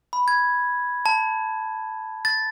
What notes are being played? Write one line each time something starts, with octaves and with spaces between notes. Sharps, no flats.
B5
G#6
A5
A6